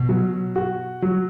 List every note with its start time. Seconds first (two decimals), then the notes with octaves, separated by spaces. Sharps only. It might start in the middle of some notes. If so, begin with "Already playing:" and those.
Already playing: B2
0.09 F#3
0.56 F#4
1.02 F#3